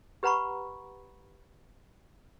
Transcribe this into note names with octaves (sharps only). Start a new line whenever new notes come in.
G4 B4 F#5 A#5 B5 C#6